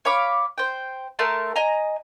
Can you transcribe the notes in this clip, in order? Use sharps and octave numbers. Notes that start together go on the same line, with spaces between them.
C#5 F5 B5 D6
C5 G5
A3 A#4 A5 C6
D#5 G#5 A#5